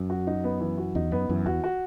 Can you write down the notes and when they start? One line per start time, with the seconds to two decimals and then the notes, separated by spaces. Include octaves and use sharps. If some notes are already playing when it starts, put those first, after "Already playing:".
Already playing: F#2
0.10 F#4
0.27 D#4
0.44 B3
0.60 E3
0.78 F#4
0.95 E2 D#4
1.11 F#2 B3
1.29 F#2 E3
1.46 E2 F#4
1.64 F#4